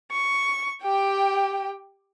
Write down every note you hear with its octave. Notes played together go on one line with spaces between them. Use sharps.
C#6
G4 G5